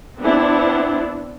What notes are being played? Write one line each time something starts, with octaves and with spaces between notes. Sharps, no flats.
B3 C4 D4 E4